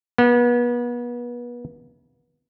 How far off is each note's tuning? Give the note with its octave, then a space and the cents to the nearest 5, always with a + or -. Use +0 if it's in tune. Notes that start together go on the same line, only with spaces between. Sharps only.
B3 -35